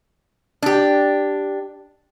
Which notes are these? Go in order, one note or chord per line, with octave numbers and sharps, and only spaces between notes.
D4 G4